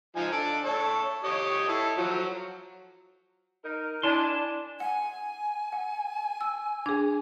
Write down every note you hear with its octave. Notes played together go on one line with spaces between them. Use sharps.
F3 D#4 G#5
D4 A4 D5
A4 C#5
G4 C#5 D#5
E4 A4
F3 F#3
D#4 A#4
D4 E4 G#5 A5 C6
F#5 G#5
F#5
E6
D4 G#4 G#6